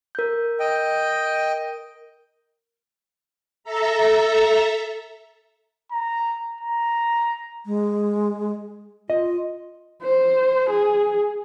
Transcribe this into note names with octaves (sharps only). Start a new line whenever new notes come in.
A#4 G6
D#5 G5
A4 E5 A#5
A#5
A#5
G#3
F4 D#5
C5
G#4